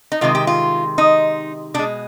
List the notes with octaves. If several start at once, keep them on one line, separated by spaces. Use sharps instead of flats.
D#4
C3 D#3 G#3 F4
G4
F4
D#4
B2 G#3 D4